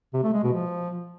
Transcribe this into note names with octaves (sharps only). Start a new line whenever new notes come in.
C3
A3
G#3
B2
F3